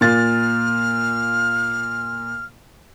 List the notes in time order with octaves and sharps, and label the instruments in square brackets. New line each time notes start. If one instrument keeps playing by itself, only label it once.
[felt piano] A#2 F4 A6 [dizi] F6